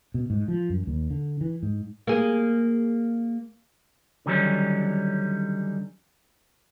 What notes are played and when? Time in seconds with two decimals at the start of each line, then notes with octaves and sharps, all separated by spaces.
0.14 B2
0.30 G#2
0.48 F3
0.70 F#2
0.87 D#2
1.10 D3
1.41 E3
1.63 G#2
2.07 A#3 G#4
4.26 D3 D#3 F#3 G3 C#4